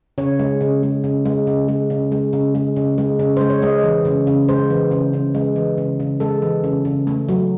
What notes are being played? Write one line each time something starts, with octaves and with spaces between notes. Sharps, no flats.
C#3 C#5
G#3
C#3
G#3
C#3
G#3
C#3
G#3
C#3
G#3
C#3
G#3
C#3
G#3
C#3
G#3 C5
C#5
G#3 D#5
E3
C#3
C#3
G#3 C5
E3
C#3
C#3
G#3
E3
C#3
C#3
G#3 A4
E3
C#3
C#3
A3
F#3